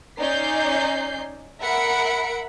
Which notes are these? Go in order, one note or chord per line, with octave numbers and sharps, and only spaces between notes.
C#4 D#4 D5 G6 C7
A#4 E5 F#5 B5 C#7 D7